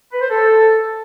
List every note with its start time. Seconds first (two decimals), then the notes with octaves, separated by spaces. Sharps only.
0.13 B4
0.21 C5
0.29 A4